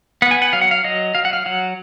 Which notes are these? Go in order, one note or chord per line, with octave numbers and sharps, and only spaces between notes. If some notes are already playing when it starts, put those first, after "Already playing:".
B3 F#5
G#5
F#5
F#3 F5
F#5
F5
F#3 D#5
F#3 F5
F#5
F5
F#3 F#5